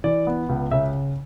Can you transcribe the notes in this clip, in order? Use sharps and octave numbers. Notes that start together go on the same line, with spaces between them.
E3 D5
B3
C#2
C#3 E5